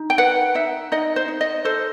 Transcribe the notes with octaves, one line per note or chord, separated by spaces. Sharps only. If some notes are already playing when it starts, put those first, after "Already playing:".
Already playing: D#4
G5
B4 F#5
D#4 E5
D#4 D#5
C5
D#4
D#5
A4 C5